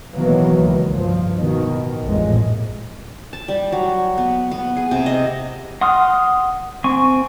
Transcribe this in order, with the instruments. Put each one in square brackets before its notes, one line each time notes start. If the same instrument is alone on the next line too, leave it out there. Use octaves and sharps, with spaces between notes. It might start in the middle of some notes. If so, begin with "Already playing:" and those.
[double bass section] B2 D#3 E3 F#3 A#3 B3
C#2
G2 F3
B2 D#3
A1 F2 A#2 G#3
[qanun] A5
G3
F#3
B3
B3
G#4
C3
D#5
[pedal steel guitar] F#5 C6 D#6 F6
C4 G#5 C#6